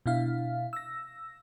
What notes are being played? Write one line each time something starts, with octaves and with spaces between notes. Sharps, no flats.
B2 D4 E4 F5
E6 A#6